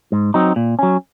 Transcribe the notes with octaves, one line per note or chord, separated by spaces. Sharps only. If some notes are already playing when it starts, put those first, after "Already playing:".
G#2
F#3 C4 D#4
A#2
F#3 C#4